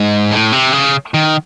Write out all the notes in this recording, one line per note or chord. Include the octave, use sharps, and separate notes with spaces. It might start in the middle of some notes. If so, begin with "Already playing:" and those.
Already playing: G#2
A2
C3
C#3
D#3